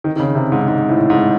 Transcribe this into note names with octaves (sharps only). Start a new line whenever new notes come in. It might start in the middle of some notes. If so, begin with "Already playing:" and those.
D#3
D#3
C#3
C3
G#2
G#2
A2
G#2